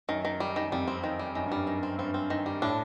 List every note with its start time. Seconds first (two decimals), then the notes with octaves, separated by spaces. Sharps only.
0.09 F#2 D#3
0.25 D#3
0.40 G3
0.56 F#2 D#3
0.72 F2 G3
0.88 C4
1.04 D#3
1.19 G3
1.35 F#2 D#3
1.46 G2
1.52 F#2 G3
1.67 D#3
1.83 C4
1.98 G2 C4
2.14 C4
2.30 D#3
2.46 G3
2.62 A2 D4